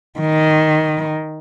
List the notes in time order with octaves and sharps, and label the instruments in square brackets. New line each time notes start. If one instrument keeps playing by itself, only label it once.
[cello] D#3